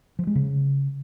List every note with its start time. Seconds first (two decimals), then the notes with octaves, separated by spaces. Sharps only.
0.19 F3
0.27 G#3
0.35 C#3